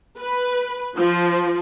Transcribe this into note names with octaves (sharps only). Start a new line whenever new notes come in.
B4
F3